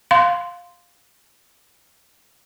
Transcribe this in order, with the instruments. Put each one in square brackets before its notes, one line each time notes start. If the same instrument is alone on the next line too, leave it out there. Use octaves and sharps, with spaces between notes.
[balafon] F5 C6